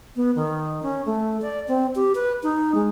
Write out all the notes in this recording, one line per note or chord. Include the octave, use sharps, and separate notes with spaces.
B3
D#3
C#4
A3
D5
C4
G4
B4
D#4
G#3